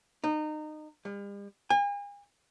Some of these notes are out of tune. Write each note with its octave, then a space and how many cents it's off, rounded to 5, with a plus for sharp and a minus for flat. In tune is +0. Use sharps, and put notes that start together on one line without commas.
D#4 -25
G3 +45
G#5 -40